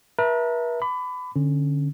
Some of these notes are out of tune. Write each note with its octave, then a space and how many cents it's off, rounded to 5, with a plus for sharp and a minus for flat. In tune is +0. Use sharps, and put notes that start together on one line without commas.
B4 -45 E5 -5 A5 +45
B5 +25 D6 +0
D3 +0 C#4 -20